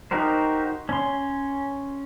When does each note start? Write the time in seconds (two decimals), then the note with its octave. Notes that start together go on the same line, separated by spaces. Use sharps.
0.11 D#4 F#4 G4 A#4 C5
0.89 C#4 C6